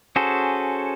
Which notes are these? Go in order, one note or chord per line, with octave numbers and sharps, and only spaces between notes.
C#4 F#4 G#4 A4 C5